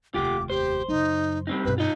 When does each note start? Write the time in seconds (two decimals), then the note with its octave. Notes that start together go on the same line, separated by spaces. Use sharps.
0.14 F1 D#2 F4 G4 D6
0.50 G4 C5
0.88 F#2 C#3 D#4
1.47 G3 C4 D#4
1.65 G2 B2 B4
1.78 D#4 F4 D#5